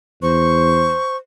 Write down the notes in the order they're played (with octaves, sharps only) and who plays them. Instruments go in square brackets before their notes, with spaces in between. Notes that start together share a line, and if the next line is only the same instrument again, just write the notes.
[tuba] E2 [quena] C5 [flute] C#6